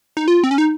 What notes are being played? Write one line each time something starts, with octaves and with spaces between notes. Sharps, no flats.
D#4
F4
C4
C#4
D#4